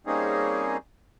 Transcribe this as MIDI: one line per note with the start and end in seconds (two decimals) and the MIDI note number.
0.07 0.77 55
0.07 0.77 58
0.07 0.77 60
0.07 0.77 61
0.07 0.77 63
0.07 0.77 68